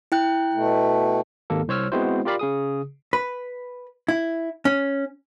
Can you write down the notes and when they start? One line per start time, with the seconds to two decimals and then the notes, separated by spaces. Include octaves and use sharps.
0.12 E4 G5 F#6
0.54 B2 A3
1.50 G#1 D#2 A#3 A4
1.68 C2 C5 C#5 E6 F6
1.92 G#3 B3 C4 E4 F#4 C5
2.25 F4 G4 A#4 D5 F5 B5
2.39 C#3 G#4 D#6
3.13 B4
4.08 E4
4.65 C#4